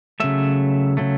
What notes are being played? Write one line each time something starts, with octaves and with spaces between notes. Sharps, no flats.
C#3 F#3 A3 E5
C#3 F#3 A3